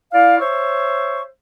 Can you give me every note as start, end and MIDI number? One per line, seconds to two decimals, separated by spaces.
0.12 0.38 64
0.12 0.38 74
0.12 0.38 77
0.39 1.21 72
0.39 1.21 73
0.39 1.21 76
0.39 1.21 85